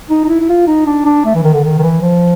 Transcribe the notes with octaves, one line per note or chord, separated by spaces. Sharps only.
D#4
D#4
E4
E4
F4
D#4
D4
D4
A3
E3
D#3
D3
D#3
D#3
E3
F3